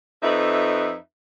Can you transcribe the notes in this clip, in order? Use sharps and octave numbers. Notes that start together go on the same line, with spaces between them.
F2 D#4 B4 E5